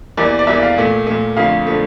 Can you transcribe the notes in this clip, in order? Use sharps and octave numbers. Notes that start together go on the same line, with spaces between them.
E2 E3 G3 A#3 D5
D5
E2 E3 G3 A#3 E5
F5
A#2 A3
A#2 A3
F2 D3 F3 A3 F5
D3 F3 A3